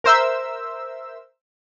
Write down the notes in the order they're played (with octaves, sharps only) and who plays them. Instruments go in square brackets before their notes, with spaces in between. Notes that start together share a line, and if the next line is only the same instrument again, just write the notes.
[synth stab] A#4 C5 E5 E6